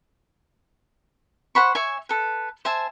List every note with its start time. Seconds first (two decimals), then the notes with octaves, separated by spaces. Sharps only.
1.55 C5 F#5 B5 C#6
1.75 C#5 E5 G#5
2.09 A4 B4
2.65 C5 E5 G#5 A5